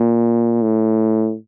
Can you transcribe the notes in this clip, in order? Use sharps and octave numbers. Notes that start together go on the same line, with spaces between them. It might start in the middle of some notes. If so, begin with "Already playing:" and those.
Already playing: A#2
A2